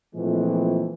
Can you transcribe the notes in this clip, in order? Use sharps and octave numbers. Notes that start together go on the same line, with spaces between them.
A#2 E3 F3 G#3 A3 C4